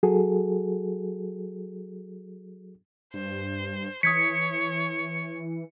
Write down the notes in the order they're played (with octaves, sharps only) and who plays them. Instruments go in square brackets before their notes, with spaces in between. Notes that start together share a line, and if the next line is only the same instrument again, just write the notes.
[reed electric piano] F#3 F#4 G#4 A4
[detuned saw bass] G2 [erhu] C5
[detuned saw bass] E3 [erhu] C#5 [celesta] D#6 G#6 B6 [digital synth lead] C#7